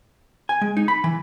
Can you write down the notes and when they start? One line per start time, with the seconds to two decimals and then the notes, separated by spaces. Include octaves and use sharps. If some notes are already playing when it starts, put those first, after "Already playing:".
0.49 G#5
0.61 G#3
0.77 D#4
0.88 B5
1.04 E3